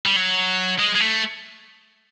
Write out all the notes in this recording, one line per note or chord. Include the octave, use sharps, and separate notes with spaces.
G3
F#3
G#3
G#3
A3